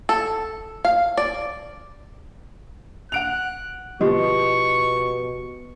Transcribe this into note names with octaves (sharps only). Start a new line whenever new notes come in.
A4
F5
D5
F#5 F#6 D7 F7
B2 F3 G4 D#5 C#6